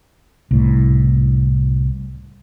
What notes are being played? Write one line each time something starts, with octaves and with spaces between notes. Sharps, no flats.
C2 A2